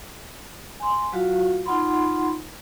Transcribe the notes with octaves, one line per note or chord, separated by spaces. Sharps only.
G#5 C6
F#3 F4 F#4 F5
D#4 F4 F#5 B5 C6